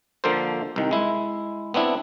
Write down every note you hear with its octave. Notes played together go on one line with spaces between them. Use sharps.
D3 F3 A#3 F4 A4 C5
C2 D#3
G#3 E4
B3 C4 D4 E4